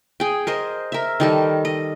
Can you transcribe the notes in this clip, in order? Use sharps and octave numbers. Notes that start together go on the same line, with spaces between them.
G#4 G5
A#4 C5 D#5
A#4 E5
D#3 G3 A4
D#5